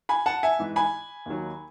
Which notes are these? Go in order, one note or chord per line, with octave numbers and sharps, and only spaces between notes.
G#5 B5
F#5 A5
E5 G#5
G#2 E3
G#5 B5
D#2 D#3 F#3